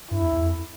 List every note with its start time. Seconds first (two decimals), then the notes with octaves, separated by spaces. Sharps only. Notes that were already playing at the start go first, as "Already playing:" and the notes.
0.11 G2 E4
0.22 E2
0.33 E2
0.44 F2